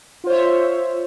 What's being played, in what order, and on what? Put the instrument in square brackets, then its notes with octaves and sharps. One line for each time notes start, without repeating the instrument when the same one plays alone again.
[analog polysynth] F4
C5
C#5
E5